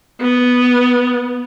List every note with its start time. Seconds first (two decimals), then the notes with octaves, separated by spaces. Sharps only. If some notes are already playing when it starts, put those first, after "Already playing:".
0.21 B3